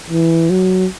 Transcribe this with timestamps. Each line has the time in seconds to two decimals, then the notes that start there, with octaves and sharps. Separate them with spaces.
0.10 E3
0.50 F#3